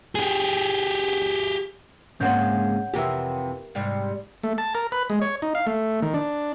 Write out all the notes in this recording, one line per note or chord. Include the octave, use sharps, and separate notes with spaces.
G4 G#4
G#2 C#3 G#3 A#3 C4 C#5 F#5 G6
F2 C3 E3 G4 A#4 E5
G#2 C3 G3
A3
A5
A#4
B4
G#3
C#5
D#4
F5
A3
D#3
D4